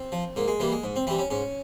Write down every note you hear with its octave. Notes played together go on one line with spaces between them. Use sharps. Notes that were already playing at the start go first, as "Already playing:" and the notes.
Already playing: C4
F3
G#2 A#3
G#3
E3 G3 A#3
G#3
G#2
C4
E3 G3 C4
C#4
G#2 C#4